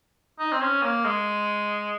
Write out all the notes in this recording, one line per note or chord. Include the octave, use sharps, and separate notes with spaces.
D#4
C4
C#4
A#3
G#3